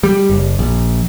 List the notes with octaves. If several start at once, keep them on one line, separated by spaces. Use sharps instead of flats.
G3
F#1
A#1